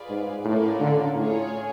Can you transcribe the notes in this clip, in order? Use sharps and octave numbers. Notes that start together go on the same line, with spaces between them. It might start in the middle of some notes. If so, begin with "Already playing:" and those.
Already playing: F4 G#4 B4 D5 F5
G#2
A2 A#3 C#4 F4 A#4 D5
D3
A2 F4 G#4 C#5